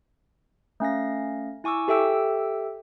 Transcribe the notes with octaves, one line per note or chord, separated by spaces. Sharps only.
A3 C#4 F5 A#6
E4 G#5 C#6 D6 E6
G4 A4 E5 G5 E6